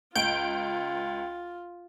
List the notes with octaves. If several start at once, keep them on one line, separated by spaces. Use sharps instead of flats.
C#2 F4 G6 D7